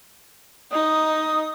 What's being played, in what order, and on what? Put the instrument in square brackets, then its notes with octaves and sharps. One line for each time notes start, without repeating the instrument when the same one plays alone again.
[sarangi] D#4 [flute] D#6